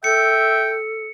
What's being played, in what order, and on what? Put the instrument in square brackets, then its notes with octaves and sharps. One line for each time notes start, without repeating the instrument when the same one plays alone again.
[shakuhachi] A4 [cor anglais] E5 [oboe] G5 [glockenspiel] C#7